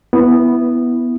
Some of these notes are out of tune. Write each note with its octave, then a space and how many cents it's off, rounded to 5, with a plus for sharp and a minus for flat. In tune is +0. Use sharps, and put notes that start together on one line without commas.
B3 +0 E4 +0